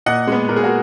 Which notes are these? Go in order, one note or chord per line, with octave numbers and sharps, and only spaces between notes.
A#2 D#5 F#5
G#3 B3
A#2 A#4
G#4
F#4 A#4